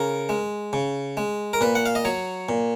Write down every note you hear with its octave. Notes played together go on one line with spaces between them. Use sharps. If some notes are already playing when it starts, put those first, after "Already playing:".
Already playing: C#3 A#4
G#3
C#3
G#3
A#4
A#2 B4
F#5
F5
D#5
F#3 C#5
A#2